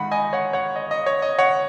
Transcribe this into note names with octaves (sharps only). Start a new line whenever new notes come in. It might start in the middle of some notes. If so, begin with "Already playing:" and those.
Already playing: G#2 D#3 F#5 B5
D#5 G#5
C#5 F#5
C#5 F#5
D#5
D#5
C#5
D#5
C#5 F#5